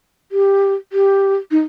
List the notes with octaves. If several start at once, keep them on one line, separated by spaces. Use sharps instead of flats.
G4
G4
D#4